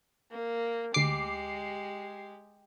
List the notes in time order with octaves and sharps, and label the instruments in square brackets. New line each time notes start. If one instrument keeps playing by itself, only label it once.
[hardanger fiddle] A#3
[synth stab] D2 D6 [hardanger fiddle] G#3 G4 [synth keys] C7